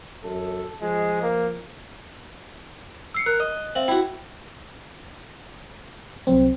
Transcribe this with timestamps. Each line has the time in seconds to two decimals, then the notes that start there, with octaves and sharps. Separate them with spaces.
0.24 F#2 A4
0.82 F3 G#3
1.22 A#3
3.14 E6 C7 C#7
3.26 A#4 F#6
3.40 D#5
3.75 C4 E5 F5 F#7
3.88 E4 F#4 G5
6.27 C2 F#3 G3 C4